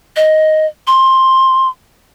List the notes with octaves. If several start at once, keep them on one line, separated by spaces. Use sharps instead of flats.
D#5
C6